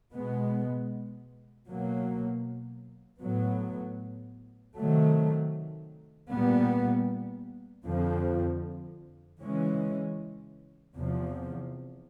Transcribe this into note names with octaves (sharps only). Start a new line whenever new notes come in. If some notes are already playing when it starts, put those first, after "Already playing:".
B2 G#3 B3
B2 F#3 A#3
A2 F#3 B3
C3 D#3 F#3 A3
A#2 G3 B3
F2 D3 F3
C#3 E3 G#3 C#4
E2 C3 F3